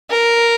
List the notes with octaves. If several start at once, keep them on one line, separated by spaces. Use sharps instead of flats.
A#4